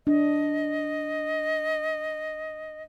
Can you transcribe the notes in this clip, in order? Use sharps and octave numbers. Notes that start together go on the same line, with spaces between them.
D4 D#5